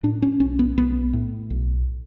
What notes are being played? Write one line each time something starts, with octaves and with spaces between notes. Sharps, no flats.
A2 D4
C#4
B1 C#4
B3
B1 B3
A2
B1